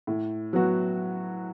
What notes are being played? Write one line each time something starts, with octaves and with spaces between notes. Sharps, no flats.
A2
F#3 B3 F#4